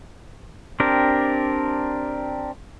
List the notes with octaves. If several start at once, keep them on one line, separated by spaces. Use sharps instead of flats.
C4 D4 G4 A#4